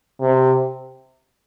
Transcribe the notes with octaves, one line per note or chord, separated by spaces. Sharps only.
C3